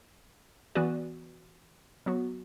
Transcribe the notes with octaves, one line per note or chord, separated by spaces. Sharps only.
E3 B3 F#4 B4 D5
F#3 B3 F#4